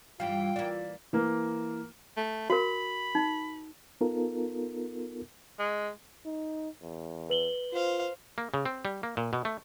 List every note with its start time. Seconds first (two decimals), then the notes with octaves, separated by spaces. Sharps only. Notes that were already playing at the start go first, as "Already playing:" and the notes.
0.20 G2 E3 G3 F4 F5 G5
0.56 E3 A#3 D5
1.13 E3 A#3
2.16 A3
2.50 F#4 A#4 B5
3.15 D#4
4.01 B3 D#4 F4 A4 A#4
5.59 G#3
6.25 D#4
6.82 E2
7.30 B4 F#7 G7
7.72 F4 C5 F5
8.38 A#3
8.54 C#3
8.65 C4
8.85 G3
9.03 A#3
9.17 A#2
9.33 B2
9.45 A3